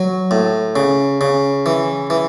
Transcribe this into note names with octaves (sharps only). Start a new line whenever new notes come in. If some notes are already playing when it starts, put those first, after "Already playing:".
Already playing: F#3
A2
C#3
C#3
E3
E3